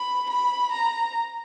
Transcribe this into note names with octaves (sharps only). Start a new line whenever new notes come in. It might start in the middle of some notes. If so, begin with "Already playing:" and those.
Already playing: B5
B5
A#5